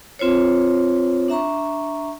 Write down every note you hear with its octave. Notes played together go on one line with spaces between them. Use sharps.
C4 F4 C5 C#5
D4 E5 A#5 C#6